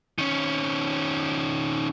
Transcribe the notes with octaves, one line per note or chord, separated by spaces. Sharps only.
D#3 C#4